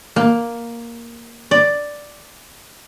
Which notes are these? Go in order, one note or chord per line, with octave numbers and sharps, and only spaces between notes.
A#3
D5